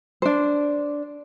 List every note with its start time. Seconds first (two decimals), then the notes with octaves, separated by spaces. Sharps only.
0.22 D4 C5